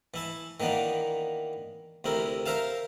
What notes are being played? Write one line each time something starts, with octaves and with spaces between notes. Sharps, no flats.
E3 E4 A5
D#3 E3 A#3 B3 D4
D2 C3 E4 A#4
A#4 C5 E5 F5 A5